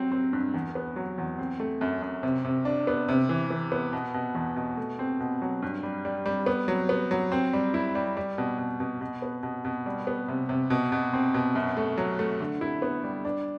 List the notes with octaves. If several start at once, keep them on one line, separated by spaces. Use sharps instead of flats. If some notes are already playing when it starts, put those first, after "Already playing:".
Already playing: F#3 C4
C4
G2
E2
B3
F#3
E2
C4
A3
F#2
F#2
C3
C3
D4
B3
C3
E3
E3
B3
B2
B2
E2
B2
A3
C4
B2
F#3
G2
G3
G3
G3
B3
F#3
B3
F#3
C4
G3
E4
G3
G3
B2
B2
B2
B2
B3
B2
B2
G3
B3
C3
C3
B2
B2
C4
B2
F#2
A3
F#3
A3
D3
E4
B3
G3
D4